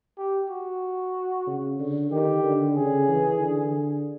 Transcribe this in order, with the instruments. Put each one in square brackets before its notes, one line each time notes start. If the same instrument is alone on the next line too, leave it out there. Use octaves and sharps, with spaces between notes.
[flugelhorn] G4
F#4
[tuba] C#3
D3
[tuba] D#3 [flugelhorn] G4
[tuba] D3
[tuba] C#3 [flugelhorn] G#4
[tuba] E3
D3